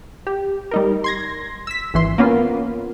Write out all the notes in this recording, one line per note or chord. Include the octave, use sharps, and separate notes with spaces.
G4
G3 D#4 A#4
C6 G#6 A#6
E6 B6
G#1 E3 C6
A#3 B3 C#4 F4